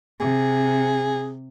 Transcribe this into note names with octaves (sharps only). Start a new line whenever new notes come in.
C3 G#4